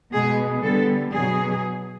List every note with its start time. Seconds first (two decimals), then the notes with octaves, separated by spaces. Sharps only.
0.12 B2 G#3 B3 G#4
0.62 D3 G3 B3 A4
1.13 B2 F#3 B3 G#4